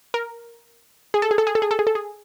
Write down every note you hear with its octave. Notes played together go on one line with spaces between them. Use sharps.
A#4
G#4
A4
G#4
A4
G#4
A4
G#4
A4
G#4
A4
G#4